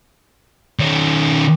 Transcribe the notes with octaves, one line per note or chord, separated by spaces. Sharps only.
D#3 C#4